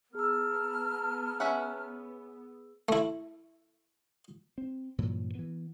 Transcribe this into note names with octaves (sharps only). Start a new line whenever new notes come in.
B3 G#4 A5 A#5 E6 F6
C#4 E5 F#5
A3 E4
C4
G2 A#2 E3 F#3
E3 B3